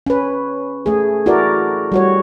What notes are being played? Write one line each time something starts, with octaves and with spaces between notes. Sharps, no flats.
C#4 B4
A3 G#4
E4 F#4 A4 A#4 D5
G3 F#4 C#5